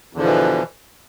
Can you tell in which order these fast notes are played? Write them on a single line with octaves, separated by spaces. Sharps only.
E2 D3 F3 B2 E3